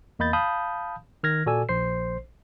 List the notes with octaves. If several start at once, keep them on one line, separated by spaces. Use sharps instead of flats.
E2 A#3 D#5 B5 G6 A6
F5 A5 B5 D#6 G6
D#3 F6 G#6 A#6
A#2 F#4 A4 D5 G#5 E6
A#1 C5 C7